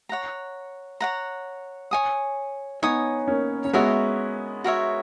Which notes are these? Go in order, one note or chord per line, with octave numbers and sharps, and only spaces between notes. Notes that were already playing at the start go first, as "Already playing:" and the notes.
C#5 F#5 A#5
C#5 F#5 A#5
C#5 G#5 D#6
B3 D#4 C#5 G#5 D#6
A#3 C#4
C#4
G#3 B3 F#4 A#4 C#5 E5
F#4 A#4 C#5 E5